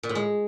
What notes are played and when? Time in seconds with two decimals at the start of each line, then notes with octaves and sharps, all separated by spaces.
0.03 A#2
0.09 A2
0.15 G#3